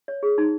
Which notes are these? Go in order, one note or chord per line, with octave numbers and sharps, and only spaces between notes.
C#5
G#4
D#4